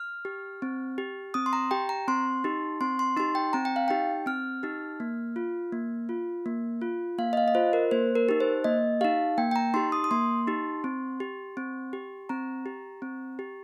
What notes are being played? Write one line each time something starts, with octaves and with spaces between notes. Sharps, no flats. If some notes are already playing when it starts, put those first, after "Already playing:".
Already playing: F6
G4
C4
G4
C4 D#6
C6
A#5
G4 G5
A#5
C4 C6
D#4 G4
C4 C6
C6
D#4 G4 C6
G5
C4 A#5
G5
F5
D#4 G4 G5
C4 F6
D#4 G4
A#3
F4
A#3
F4
A#3
F4
A#3 F5
D#5
F5
D#5
F4 C5
A#4
A#3 C5
A#4
D#4 G4
C5
A#3 D#5
D#4 G4 F5
A#3 G5
G5
A#5
D#4 G4 C6
D#6
D#6
A#3 C6
D#4 G4
C4
G4
C4
G4
C4 A#5
G4
C4
G4